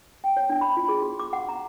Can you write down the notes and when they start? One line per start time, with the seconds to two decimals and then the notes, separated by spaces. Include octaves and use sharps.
0.24 G5
0.37 C#5
0.50 D4
0.61 B5
0.77 F4
0.89 G#4
1.02 F#4
1.19 D6
1.33 F#5
1.49 A#5